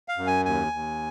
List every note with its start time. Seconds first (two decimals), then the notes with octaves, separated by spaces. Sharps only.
0.08 F5
0.18 F#2
0.27 G#5
0.45 D#2 G#5
0.73 D#2